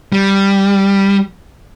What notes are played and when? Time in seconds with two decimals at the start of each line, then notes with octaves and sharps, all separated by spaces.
0.12 G3